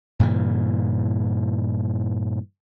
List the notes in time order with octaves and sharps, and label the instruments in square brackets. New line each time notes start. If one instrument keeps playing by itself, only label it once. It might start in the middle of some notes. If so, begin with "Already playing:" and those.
[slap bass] G2 A#2 C#3 E3